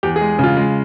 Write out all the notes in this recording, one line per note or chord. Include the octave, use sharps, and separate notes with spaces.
E2 G4
G#4
G#3
C#3 F4
G#3